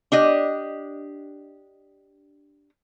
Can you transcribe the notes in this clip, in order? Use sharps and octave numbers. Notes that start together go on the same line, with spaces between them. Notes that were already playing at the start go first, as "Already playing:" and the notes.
D4 G4 D#5